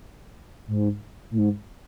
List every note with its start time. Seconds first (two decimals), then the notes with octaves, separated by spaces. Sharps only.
0.67 G#2
1.31 A2
1.38 G#2